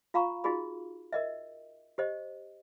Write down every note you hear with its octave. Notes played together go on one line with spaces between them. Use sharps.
F4 F5 A#5 B5 C#6
D#4 F4 F#4 G#4 B5
A#4 D#5 E5
G4 C5 D#5